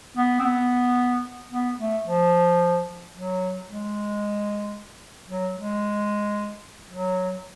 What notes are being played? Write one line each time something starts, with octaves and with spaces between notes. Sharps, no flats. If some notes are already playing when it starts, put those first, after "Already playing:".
B3
C4
B3
B3
A3
F3
F#3
G#3
F#3
G#3
F#3